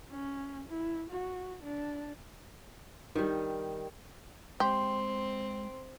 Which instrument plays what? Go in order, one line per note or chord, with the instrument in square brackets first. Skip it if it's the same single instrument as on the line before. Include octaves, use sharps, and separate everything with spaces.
[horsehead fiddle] C#4
E4
F#4
D4
[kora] D#3 G3
[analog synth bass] G#3 [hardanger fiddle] C4 [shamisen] G4 [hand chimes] C6